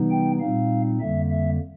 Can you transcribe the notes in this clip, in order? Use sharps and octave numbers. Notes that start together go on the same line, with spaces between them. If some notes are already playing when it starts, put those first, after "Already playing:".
Already playing: C3 E3 G3 B3 D#4
G5
A#2 G3 C4 D#4 F5
F2 D3 G3 A#3 E5
E5